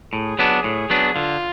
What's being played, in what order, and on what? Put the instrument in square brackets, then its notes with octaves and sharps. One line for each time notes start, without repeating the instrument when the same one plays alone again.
[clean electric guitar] A2 [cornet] G#4
[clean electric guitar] F#3 B3 D4
A2
F#3 B3 D4
[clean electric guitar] D3 [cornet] F4